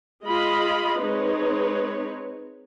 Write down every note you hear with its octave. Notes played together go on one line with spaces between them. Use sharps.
G#3 F4 D#5 B5
G#3 C4 D#4 B4 C#5